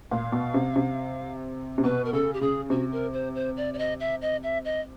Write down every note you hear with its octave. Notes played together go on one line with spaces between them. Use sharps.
A#2 F5
B2
C3
C3
C3
B2 B4
A#4
C#3 A4
G4
C#3 G#4
C3 F#4
A#4
C5
C5
D5
D5
D#5
E5
D#5
E5
D#5